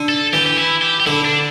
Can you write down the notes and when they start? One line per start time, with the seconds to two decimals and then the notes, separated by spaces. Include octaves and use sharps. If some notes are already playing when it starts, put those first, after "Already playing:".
Already playing: D3
0.09 A4
0.33 E3 G4
0.46 G4
0.58 E4
0.82 G4
1.00 G4
1.06 D3 E4
1.25 D4